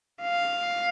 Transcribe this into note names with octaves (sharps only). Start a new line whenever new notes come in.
F5